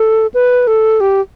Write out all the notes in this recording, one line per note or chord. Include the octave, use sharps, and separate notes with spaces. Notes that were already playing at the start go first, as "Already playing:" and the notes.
Already playing: A4
B4
A4
G4